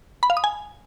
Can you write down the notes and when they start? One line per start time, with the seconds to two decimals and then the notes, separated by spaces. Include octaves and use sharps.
0.23 B5
0.30 F5
0.37 D#6
0.44 G#5